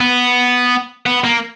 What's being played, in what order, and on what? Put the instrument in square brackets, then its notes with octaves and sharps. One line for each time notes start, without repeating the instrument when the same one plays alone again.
[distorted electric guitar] B3
B3
A#3